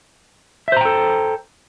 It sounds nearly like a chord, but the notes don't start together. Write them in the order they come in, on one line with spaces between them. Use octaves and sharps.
E5 C5 A#5 G5 A4